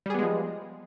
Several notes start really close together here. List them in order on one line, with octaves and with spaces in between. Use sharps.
G3 G#4 B3 G#3 F3